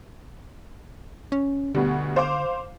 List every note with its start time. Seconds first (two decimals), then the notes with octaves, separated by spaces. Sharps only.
1.32 C#4
1.75 D2 B2 D3 G3
2.16 C5 F5 D6